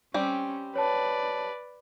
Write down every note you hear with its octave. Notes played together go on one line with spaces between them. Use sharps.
G3 C4 C#4 G4
B4 C#5 D5 A5